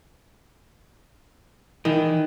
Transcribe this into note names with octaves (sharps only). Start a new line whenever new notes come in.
D#3 E3